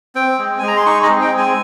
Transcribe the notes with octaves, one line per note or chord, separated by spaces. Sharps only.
C4 G5
G#3
G#3 G#5
A#5
C6
D#4 C#6
D#5
C4
G5
G#3
G#5